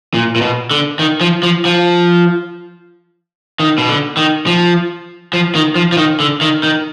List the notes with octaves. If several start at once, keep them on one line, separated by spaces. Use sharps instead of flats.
A#2
A#2
B2
D3
D#3
F3
F3
F3
D#3
B2
D3
D#3
F3
F3
D#3
F3
F3
D#3
D3
D#3
D#3